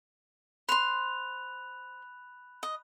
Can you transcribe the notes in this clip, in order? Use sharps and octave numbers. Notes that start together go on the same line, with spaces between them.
C5 B5 C6 F#6 F7
D#5